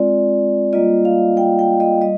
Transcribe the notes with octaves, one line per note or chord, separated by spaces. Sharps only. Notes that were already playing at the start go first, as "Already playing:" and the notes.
Already playing: G#3 C4 F4 D5
G3 A#3 F4 D#5
F5
G5
G5
D#5
G3 D#5